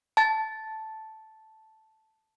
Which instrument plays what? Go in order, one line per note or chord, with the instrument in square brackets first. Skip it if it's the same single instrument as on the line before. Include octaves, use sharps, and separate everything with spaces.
[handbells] A5 A6